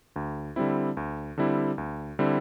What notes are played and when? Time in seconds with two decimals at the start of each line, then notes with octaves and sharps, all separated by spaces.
0.16 D2
0.56 D3 G3 C4 E4
0.97 D2
1.38 D3 G3 C4 E4
1.78 D2
2.19 D3 G3 C4 E4